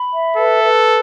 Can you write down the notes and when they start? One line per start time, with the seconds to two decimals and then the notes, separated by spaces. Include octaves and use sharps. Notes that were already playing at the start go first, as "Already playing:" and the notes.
Already playing: B5
0.12 E5
0.37 A4 B4
0.63 B4